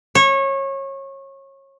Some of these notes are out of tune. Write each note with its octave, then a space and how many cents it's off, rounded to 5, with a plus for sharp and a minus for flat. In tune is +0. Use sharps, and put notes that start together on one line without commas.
C#5 -25